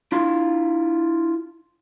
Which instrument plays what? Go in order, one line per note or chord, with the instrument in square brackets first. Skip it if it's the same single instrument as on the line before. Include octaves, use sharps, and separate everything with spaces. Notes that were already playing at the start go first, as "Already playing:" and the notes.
[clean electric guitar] D4 E4 F4 C6